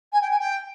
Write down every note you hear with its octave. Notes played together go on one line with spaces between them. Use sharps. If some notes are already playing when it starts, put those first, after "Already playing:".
G#5
G5
G#5
G5